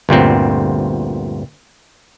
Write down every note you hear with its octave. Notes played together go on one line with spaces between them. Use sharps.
G1 D2 A#2 C4